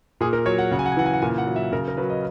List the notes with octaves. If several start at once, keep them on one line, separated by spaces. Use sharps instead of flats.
A#2 G#4
A#4
F#3 C#5
F#5
C#3 F#5
G#5
F#5
G#5
E3 F#5
G#5
F#5
A#2 G#5
F#5
F#3
E5
C#3 A#4
A#4
F#3 B4
D#5